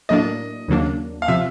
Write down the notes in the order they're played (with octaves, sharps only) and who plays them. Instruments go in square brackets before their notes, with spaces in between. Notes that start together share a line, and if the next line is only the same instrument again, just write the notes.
[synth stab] A2 F#3 A#3 D4 [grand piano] D#5
[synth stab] D#2 C#3 F#3 A#3 D4
[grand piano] F5
[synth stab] C3 F3 [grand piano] E5